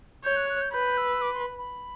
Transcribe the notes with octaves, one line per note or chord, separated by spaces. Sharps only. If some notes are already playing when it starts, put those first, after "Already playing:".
C#5 G6
F#6
F#6
G6
B4 G6
E6
D6
C6
B5
B5